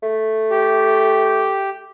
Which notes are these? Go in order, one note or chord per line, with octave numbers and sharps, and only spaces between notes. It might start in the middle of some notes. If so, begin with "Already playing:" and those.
A3
G4